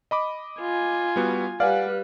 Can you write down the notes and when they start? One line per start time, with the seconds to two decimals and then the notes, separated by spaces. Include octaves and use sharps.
0.11 D#5 B5 D6
0.60 F4 G#5
1.16 G3 B3 F#4
1.60 G3 B4 D5 F5 F#5 G#5